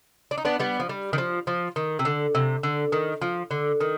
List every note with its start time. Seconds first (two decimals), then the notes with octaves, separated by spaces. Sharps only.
0.31 D4
0.38 D#4
0.45 B3 D4
0.60 G3 B3
0.80 F3
0.89 G3
1.13 D#3
1.18 F3
1.47 F3
1.76 D#3
1.99 C3
2.05 D3
2.35 C3
2.63 D3
2.92 D#3
3.22 F3
3.51 D3
3.81 D#3